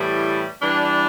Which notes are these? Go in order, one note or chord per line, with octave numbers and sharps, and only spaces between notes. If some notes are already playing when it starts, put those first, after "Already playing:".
Already playing: A2 E3 G3
E3 G3 D4